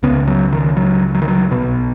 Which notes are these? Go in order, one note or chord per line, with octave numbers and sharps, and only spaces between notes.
C#2 C#3 B3
F#3
D#3
F#3
F#3
D#3
F#3
B1 B2 B3